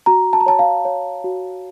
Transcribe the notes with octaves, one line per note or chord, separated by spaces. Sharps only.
F#4 A#5
A5
A#5
C#5 A5
F5
C#5
F#4